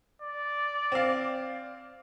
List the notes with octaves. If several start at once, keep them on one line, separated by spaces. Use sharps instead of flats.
D5
C4 F5